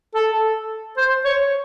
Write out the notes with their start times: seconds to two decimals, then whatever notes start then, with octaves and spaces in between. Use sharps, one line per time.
0.15 A4
0.97 C5
1.25 C#5